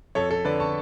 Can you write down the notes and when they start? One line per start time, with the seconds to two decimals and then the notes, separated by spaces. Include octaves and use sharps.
0.15 F2 A4 C#5
0.30 A4 C#5
0.45 D3 B4 D5
0.60 A5 C#6